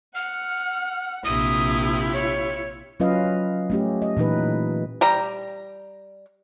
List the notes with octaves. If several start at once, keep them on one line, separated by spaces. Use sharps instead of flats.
F#5 F6
A#1 C3 E4 F4 G4 D#6
C#5
F#3 C#4 F4 B4 D#5 F5
A3 C#4 G4
D#5
A#2 E3 D#4 B4
G3 A#5